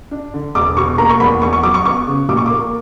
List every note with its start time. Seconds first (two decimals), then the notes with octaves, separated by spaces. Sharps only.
0.11 D4
0.34 D3
0.55 E1 D6
0.77 B2 C#6
0.98 A#3 A#5
1.10 C#6
1.20 E2 B5
1.42 E2 C#6
1.53 C#6
1.63 F#3 D6
1.74 C#6
1.85 B3 C#6
2.07 C#3
2.29 A#2 D6
2.37 C#6
2.46 A#3 D6